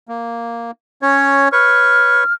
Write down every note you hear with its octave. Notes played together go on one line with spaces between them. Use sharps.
A#3
C#4 C#5
B4 C#5 C#6 F6